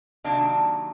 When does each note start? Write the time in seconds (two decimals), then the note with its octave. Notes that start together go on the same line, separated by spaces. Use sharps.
0.24 C3 D#3 F#3 A#3 D4